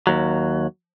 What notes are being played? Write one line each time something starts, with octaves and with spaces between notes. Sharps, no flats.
D#2 F#3